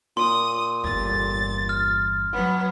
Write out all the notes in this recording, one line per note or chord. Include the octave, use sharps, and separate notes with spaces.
A#2 C6 D#6
G1 E2 A6
F6
F#3 B3